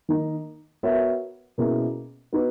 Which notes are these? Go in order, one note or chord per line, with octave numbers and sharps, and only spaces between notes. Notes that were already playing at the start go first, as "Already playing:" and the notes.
D#3 A#3 D#4
B3 F#4 A#4 C#5 E5
B2 A#3 C#4 E4 G#4
B3 D#4 F#4 B4